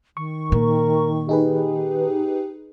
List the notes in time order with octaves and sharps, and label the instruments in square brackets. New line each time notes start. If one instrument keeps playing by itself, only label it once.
[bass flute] D#3 [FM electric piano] C#6
[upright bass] A#2 [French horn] A#4
[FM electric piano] D#4 G#4 B4 [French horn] G4